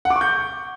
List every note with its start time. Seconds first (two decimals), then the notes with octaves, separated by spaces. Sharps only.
0.05 F#5
0.10 D6
0.16 C#6
0.21 G6